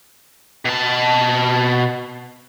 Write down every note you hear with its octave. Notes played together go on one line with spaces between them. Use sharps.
B2 A5